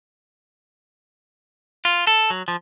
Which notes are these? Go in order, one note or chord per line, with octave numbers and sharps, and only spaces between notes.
F4
A4
F#3
F3